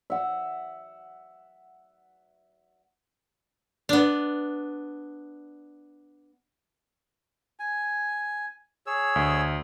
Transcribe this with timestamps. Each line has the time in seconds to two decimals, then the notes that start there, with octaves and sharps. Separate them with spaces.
0.10 E5 F#5
3.89 B3 D4
7.60 G#5
8.86 G#4 C#5 E6
9.16 D2